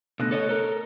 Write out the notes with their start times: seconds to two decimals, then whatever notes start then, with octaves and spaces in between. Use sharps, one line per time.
0.20 B2 D3 A3 F#6 A#6
0.31 A4 C#5 D#5
0.49 A4 A#4